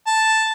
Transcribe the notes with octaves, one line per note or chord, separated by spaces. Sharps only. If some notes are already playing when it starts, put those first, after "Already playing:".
A5